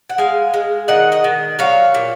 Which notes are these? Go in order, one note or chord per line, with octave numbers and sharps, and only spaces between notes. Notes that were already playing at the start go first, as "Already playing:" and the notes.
F#5
G#3 F5 G#5
G#3
D#3 D#5 F#5
D#5 F#5
D#3
F#3 C#5 F5
A#2